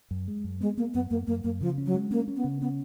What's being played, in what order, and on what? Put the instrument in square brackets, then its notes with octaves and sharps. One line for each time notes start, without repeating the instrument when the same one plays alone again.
[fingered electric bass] F#2
G#3
F#2
[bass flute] G#3 [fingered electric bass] B3
[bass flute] A#3 [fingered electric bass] B3
[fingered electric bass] F#2 [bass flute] B3
[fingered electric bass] F#2 [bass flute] A#3
[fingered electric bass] F#2 [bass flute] A#3
[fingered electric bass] F#2 [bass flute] A#3
[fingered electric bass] C#3 [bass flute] F3
[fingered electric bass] C#4
[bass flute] F#3
[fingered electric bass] G#3
[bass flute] A#3 [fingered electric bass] C#4
[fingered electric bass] C#4
[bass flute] B3
[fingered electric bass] C#3
[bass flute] B3 [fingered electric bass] C#4